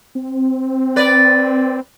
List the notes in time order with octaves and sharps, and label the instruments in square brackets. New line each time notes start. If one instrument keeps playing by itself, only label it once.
[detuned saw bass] C4
[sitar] B4 D5